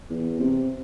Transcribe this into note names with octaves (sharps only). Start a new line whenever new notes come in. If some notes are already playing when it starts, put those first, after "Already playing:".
E2
C3